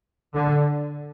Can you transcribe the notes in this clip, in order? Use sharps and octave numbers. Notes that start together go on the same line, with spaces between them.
D3